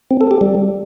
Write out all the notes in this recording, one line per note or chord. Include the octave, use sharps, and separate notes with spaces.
C4
A4
G4
G3